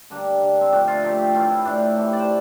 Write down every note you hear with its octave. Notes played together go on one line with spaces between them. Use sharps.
D3 G3 A#3 D4
D3 G3 A#3
C4
A#2 F3 A3 D4
F4
A#2 F3 A3 G4
G4
A2 E3 A3 F4
E4
A2 E3 A3 D4
C3 E3 A3
D5
C5